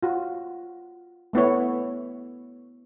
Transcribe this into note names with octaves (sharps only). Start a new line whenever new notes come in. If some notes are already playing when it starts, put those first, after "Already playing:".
F4 F#4
A3 B3 E4 C#5